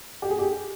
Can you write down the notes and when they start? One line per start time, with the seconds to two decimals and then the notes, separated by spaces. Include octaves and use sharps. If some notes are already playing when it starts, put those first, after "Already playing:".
0.22 G4
0.30 G#4
0.39 G4